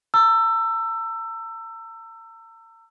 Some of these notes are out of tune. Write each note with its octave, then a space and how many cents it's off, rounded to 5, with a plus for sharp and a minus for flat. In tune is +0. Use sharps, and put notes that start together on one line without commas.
A#5 -40 E6 +20